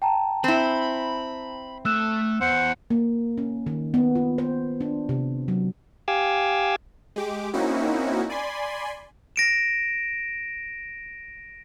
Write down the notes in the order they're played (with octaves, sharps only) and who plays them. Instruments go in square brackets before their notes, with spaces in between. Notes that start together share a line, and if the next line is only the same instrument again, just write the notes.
[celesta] G5 A5 A#5
[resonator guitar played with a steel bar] C4 E4 [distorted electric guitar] B5
[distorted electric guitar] A3 [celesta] E6 F#6 E7
[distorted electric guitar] E2 [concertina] C5 F#5
[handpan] A#3
C#4
D#3
B3
F4
C5
D4
C3
F#3
[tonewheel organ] G4 F5 G#5 D6 E6
[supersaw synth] G#3 G4 D6
A#3 C4 C#4 D#4 E4 F#4
D5 G#5 B5 C6
[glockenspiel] A#6 D7 E7